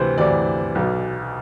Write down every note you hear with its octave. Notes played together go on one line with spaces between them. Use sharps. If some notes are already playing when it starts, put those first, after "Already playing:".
Already playing: D2 C3 E3 B4 C5
D2 C3 E3 D5
B1 B2